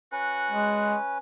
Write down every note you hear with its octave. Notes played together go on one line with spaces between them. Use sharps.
C#4 F#4 B4
G#3